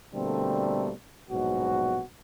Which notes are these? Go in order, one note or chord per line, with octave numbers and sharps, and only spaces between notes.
B2 D3 G3 A3 A#3 C4
A#1 G#2 B2 F#3 F#4